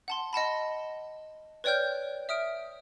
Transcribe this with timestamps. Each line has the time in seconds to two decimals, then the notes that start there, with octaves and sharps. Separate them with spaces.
0.08 F#5 A5 C6
0.33 D#5 F#5 A5 B5
1.64 B4 C#5 D5 G5 F6 G6
2.29 E5 D#6 F6 D7